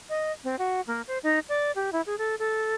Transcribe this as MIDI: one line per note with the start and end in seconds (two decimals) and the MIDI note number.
0.10 0.32 75
0.44 0.56 60
0.59 0.81 66
0.87 1.02 58
1.08 1.18 72
1.23 1.39 63
1.49 1.72 74
1.76 1.90 67
1.93 2.01 64
2.06 2.18 68
2.18 2.35 69
2.39 2.75 69